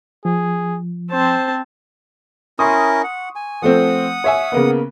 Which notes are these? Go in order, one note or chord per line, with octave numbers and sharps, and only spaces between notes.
F3 G#4
C4 C5 A5
C#4 E4 A#4 C6 C#6 D#6
F#5
G#5
F3 A3 C4 F#5 D#6
C#5 E5 G#5
C#3 A#3 B3